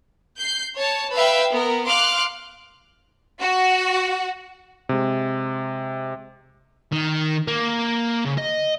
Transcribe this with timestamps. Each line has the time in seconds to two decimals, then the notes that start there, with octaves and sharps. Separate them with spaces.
0.40 G6 C7
0.76 C#5 A5
1.15 B4 E5 F5 G5 E6
1.53 B3 A#4
1.85 F5 C6 D6 F6 F#6
3.40 F#4
4.89 C3 G#3
6.92 D#3
7.48 A#3
8.25 C#3
8.37 D#5